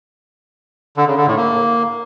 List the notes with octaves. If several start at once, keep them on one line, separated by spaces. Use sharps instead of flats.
D3
C#3
D3
A2
A#3